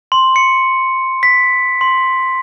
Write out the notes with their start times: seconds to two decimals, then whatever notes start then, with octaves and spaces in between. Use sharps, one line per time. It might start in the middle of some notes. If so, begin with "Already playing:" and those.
0.12 C6
0.36 C#7
1.23 B6
1.81 C6